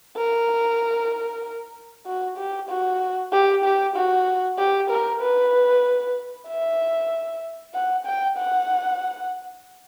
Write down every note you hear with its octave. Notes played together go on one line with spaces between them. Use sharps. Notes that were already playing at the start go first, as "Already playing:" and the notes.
A#4
F#4
G4
F#4
G4
G4
F#4
G4
A#4
B4
E5
F#5
G5
F#5